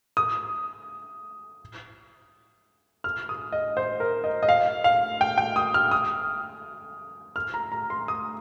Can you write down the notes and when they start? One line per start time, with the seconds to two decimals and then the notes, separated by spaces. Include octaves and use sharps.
0.17 D#6
3.04 F6
3.29 D#6
3.52 D#5
3.77 C5
4.00 A#4
4.24 D#5
4.43 D#5
4.49 F5
4.84 F5
5.21 G5
5.38 G5
5.56 D#6
5.74 F6
5.91 D#6
7.36 F6
7.54 A#5
7.72 A#5
7.90 C6
8.08 D#6